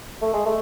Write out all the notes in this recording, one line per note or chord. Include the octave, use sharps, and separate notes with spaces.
A3
G#3
A3